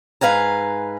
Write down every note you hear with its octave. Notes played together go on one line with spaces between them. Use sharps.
G#2 B4 F5 G#5 A#5